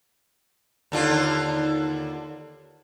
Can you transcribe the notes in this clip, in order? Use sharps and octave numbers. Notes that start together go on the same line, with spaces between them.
D#2 D3 F4